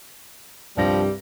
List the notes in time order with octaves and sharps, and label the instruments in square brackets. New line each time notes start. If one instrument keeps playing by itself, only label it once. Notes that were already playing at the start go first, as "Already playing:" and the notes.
[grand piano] C2 G2 A#6 [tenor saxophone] F3 [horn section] G3